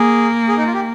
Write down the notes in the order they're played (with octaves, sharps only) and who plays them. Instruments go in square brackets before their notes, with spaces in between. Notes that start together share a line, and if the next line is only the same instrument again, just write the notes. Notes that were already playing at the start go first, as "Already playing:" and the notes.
Already playing: [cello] A#3 [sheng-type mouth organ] G#4
[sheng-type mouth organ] G#4
D#4
F4
G4